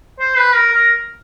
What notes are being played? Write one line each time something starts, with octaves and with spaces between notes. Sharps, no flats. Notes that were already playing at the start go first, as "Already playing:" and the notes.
C5
B4
A#4
A#4